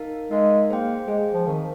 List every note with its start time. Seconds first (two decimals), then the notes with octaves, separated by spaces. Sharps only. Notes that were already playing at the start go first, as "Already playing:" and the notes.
Already playing: D#4 A#4 F5
0.31 G#3 D#4 A#4 F5
0.70 A#3 G#4 C5 G5
1.08 G#3 G#4 C5 G5
1.34 F3
1.47 D#3 C4 D#4 A#4 F5